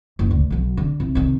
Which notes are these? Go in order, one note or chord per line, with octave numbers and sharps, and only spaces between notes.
F#1
D2
B1 F#3
D3
C2
C3 D#3